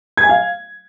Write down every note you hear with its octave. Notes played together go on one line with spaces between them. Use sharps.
G#6
G#5
F5